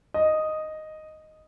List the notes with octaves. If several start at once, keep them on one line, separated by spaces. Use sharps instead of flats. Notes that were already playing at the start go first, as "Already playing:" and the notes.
D#5